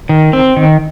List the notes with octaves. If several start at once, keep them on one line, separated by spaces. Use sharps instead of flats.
D#3
C4
D#3